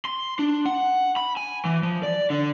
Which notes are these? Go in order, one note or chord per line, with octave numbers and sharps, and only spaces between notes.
C6
D4
F#5
B5
G#5
E3
F3
D5
D3